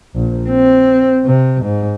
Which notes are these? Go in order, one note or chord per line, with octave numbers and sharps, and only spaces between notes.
A#1
C4
C3
G#2